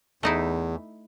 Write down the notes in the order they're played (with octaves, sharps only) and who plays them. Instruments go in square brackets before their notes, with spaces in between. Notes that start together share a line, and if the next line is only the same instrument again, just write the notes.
[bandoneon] E2 [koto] A3 D#4 E4